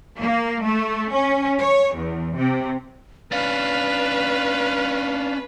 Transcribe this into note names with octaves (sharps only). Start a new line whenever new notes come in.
A#3
A3
C#4
C#5
E2
C3
C#4 D4 B4 F5